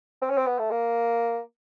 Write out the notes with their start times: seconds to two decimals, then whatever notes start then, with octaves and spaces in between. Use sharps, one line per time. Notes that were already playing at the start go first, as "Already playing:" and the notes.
0.22 C4
0.30 C#4
0.37 C4
0.46 B3
0.59 A3
0.71 A#3